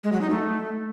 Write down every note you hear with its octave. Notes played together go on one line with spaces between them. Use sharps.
G#3
F#3
D#4
A3